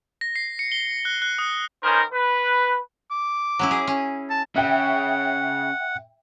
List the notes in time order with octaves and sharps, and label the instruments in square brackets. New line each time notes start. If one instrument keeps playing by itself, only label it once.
[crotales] A#6
C7
C#7
G7
F#6
F#6
D#6
[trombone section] D#3 B3 C#4 D#4 A#4 C5
B4
[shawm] D6
[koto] F#3 C#4 E4
G#4
C#4
[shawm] A5
[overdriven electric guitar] C#3 [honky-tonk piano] E5 G5 [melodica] F#5